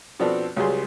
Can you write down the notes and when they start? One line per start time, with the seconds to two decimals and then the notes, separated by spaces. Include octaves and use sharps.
0.19 B2 F3 B3 C4 D4 A4
0.56 C#2 C#3 F#3 G3 G#4 C6